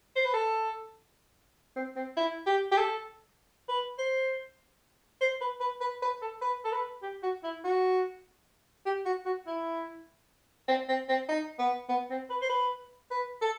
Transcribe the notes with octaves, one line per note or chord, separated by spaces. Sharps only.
C5
B4
A4
C4
C4
E4
G4
G4
A4
B4
C5
C5
B4
B4
B4
B4
A4
B4
A4
B4
G4
F#4
E4
F#4
G4
F#4
F#4
E4
C4
C4
C4
D#4
B3
B3
C4
B4
C5
B4
B4
A4